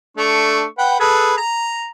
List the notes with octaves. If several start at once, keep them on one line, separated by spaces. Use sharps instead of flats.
A3 D4 C#6
B4 F#5 G5
G#4 A4 B4
A#5